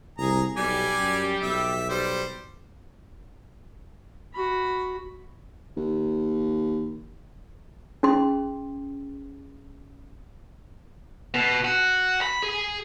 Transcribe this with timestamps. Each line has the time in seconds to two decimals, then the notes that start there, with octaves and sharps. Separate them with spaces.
0.18 C2 G#4 A#5
0.57 B1 G3 G4 D5 G#5
0.99 F#2
1.42 B1 E5
1.89 G3 C5
4.34 F#4 B5
5.77 D#2
8.03 C#4 G#4 C6
11.34 B2
11.64 F#4
12.21 B5
12.42 G#4